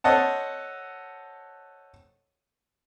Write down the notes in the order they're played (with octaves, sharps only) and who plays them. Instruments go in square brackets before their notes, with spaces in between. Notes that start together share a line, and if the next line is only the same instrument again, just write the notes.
[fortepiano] A4 C5 C#5 D#5 F#5 A5